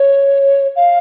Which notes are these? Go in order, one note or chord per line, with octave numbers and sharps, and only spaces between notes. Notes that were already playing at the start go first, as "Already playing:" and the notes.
Already playing: C#5
F5